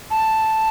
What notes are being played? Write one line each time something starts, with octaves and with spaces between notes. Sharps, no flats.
A5